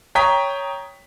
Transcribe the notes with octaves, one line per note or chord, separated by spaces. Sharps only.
C#5 G5 A#5 D#6 B6